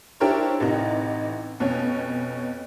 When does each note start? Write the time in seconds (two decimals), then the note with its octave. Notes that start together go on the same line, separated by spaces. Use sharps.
0.20 D4 E4 G4 A#4 C5 C#5
0.60 A1 C3 E3 D#4
1.60 F2 B2 C#4 C#5